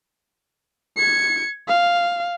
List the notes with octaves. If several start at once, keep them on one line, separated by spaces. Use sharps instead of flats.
G#6 C#7
F5